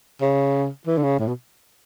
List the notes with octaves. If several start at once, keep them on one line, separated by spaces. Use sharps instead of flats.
C#3
E3
D3
C#3
A2
B2